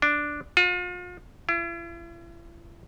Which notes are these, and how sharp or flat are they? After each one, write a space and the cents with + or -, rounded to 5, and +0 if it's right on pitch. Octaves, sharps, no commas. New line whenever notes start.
D4 +0
F4 +40
E4 +45